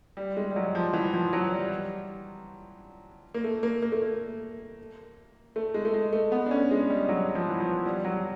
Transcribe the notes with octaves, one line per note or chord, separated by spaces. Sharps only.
G3
G#3
G3
F#3
F3
E3
F3
F#3
G3
A#3
A3
A#3
A#3
A3
A#3
A3
G#3
A3
G#3
A3
B3
D4
C#4
G#3
G3
F#3
F3
E3
F3
G3
F#3